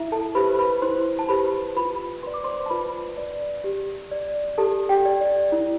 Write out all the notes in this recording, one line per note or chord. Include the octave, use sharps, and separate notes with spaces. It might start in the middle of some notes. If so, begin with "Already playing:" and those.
Already playing: E4 E5
A4 A5
G4 B4 C5 B5
B4 B5
E4 C5 C6
A5
G4 B4 C5 B5
F4 B4 B5
B4 D5 C6
D6
C5 C6
A5
F4 B4 B5
B4 D5
G4
D5
G4 A4 A5
G4 G5
D5
D5
E4